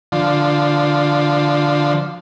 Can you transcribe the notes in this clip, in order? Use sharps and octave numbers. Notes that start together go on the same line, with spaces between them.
D3 F3